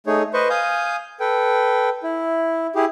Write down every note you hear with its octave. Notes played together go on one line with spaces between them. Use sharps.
A3 D#4 G#4 C#5
B4 C5 D#5 C#6
F5 G#5 D#6 G6
A4 B4 G5
E4
E4 G4 G#4